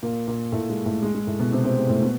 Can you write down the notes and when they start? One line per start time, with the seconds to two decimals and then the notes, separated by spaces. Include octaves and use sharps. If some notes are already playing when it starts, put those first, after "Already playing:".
0.03 A#2 A#3
0.28 A#2 A#3
0.52 A2 A3
0.70 G#3
0.86 A2 A3
1.03 G#3
1.15 G#3
1.27 A2 A3
1.39 B2 B3
1.52 C3 C4
1.64 C3 C4
1.77 G#3
1.90 A2 A3
2.02 B2 B3